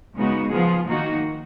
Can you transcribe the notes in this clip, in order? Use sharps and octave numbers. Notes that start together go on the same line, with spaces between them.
C#3 G#3 B3 D#4 F#4
F3 B3 F4 G#4
D#3 A#3 D#4 F#4